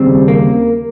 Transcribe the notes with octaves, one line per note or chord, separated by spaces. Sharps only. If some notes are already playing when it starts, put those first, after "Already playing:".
Already playing: D#2 C#3 G3 C4
A#3